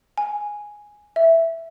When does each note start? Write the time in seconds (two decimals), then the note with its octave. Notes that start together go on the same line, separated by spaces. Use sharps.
0.18 G#5
1.16 E5